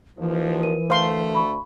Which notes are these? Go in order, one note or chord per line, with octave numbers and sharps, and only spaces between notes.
D#2 E3 F3
A#4 D#7
D2 A3 C5 F5 C6
B5 C#6